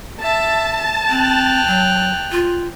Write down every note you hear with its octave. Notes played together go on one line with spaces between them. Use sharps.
E5 A5
C4 G5 F6 F#6
F#3
F4